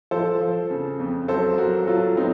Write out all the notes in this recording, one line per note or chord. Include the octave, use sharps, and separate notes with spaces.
F3 A4 C5
F3
C#3
F2
F#3 A4 C5
F#3 F#4 A#4
F#3 F4 A4
F#3 C4 D#4